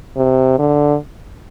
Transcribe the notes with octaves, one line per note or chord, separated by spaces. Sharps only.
C3
D3